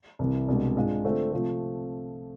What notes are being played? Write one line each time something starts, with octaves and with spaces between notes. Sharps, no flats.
C2 C3 E3
C2 B2 G#3 D4
G#2 G#3 D4 F4
D3 A3 C4 F4
C3 F3 A3